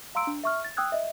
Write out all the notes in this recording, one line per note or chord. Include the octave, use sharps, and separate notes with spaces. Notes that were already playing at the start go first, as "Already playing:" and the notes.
F5 A#5 C6 E6 D7
D4
E5 C#6 F6
A6
G5 D#6 E6 F#6 G#6
D#5 E5